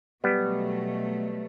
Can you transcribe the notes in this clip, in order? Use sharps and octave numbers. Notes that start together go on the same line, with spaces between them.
B2 F#3 G3 A3 B3